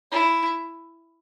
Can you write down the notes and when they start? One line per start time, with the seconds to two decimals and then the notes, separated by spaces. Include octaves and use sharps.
0.12 E4